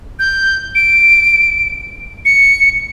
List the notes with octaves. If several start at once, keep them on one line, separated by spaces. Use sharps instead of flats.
G6
D7
C#7